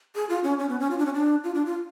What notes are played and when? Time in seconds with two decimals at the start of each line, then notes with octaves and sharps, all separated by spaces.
0.15 G#4
0.29 F4
0.44 C#4
0.59 C#4
0.69 B3
0.80 C#4
0.91 F4
0.98 D4
1.06 C#4
1.14 D4
1.44 F4
1.55 D4
1.66 F4